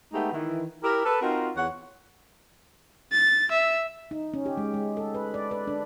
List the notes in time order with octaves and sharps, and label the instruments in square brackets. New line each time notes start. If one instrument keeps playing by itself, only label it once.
[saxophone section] G#3 A3 B3 D#4 G4
D#3 E3
E4 G4 A#4
A4 B4
C4 D#4 F4 F#4 A#4
E2 C#5 F#5
[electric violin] A6
E5
[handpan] D#4
C#4
G4
G#3
G#3
A4
B4
D5
B4
D4